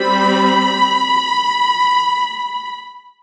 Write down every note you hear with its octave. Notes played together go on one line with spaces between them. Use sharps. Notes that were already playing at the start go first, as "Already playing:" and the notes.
Already playing: G3 C4 B5